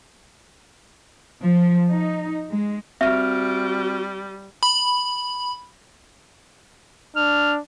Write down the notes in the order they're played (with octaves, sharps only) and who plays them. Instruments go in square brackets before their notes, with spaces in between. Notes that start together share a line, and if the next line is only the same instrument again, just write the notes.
[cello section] F3
D#4
G#3
[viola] G3 [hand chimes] C4 F6 [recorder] F#4 [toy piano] E5
[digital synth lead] B5
[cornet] D4 [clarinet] F6